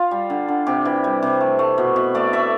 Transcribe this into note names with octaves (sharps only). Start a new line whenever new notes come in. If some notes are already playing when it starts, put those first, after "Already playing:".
Already playing: F4
G3
D3
D3
C3 G4
E3
G3
C3
A3
A3
B2
B2
A3 D5
A3 E5